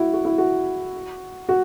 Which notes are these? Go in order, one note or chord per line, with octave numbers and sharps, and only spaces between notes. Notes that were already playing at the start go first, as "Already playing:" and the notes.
Already playing: E4 F#4
F#4
E4
F#4
F#4